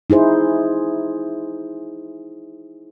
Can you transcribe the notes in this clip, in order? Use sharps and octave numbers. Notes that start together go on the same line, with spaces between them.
D#4 E4 G#4 C5